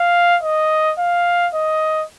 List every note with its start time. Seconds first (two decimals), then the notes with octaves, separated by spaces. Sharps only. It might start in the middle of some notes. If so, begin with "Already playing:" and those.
Already playing: F5
0.43 D#5
0.99 F5
1.54 D#5